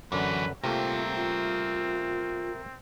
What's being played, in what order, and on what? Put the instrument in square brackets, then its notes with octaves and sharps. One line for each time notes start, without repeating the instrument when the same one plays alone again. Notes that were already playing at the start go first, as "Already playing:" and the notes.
[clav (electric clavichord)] F#2 D3 [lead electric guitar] E3 F#3 [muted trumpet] B4
[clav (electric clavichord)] C3 A3 A#3 [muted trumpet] C4 [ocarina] F4 [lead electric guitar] A#4 E5
[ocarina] F4